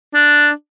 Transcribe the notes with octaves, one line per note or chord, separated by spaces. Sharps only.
D4